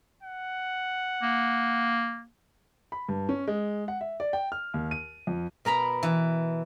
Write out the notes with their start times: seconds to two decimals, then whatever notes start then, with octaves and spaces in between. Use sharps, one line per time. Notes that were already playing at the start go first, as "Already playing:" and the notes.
0.23 F#5
1.23 A#3
2.92 B5
3.09 G2
3.29 C#4
3.48 G#3
3.88 F#5
4.01 E5
4.20 D5
4.33 G5
4.52 F6
4.74 D#2
4.91 D#7
5.27 F2
5.65 B2 A#4 A#5 B5
6.03 E3